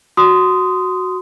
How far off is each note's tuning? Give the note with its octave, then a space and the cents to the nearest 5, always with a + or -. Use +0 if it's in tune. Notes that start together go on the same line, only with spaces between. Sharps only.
F#4 +0 C6 -20 D#6 +0